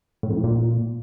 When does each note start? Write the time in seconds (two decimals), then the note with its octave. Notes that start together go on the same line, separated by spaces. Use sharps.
0.23 A2
0.30 F2
0.37 A2
0.44 A#2